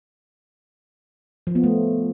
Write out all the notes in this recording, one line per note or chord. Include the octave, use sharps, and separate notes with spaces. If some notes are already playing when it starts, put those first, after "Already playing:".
F3
B3
A3